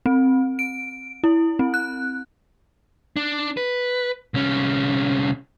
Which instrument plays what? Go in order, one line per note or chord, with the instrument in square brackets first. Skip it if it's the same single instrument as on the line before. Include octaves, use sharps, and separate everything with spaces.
[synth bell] C4
D7
E4
C4
F#6
[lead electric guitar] D4
B4
C2 C#4